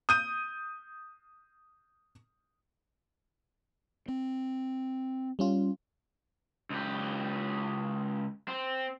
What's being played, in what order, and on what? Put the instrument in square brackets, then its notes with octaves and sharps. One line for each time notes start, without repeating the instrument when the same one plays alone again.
[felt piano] D#6 G6 D#7
[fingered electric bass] C4
[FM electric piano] G3 C#4 F4
[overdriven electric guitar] C#2 G4
C4